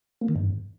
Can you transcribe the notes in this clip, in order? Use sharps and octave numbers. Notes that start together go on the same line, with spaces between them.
A#3
D#3
G2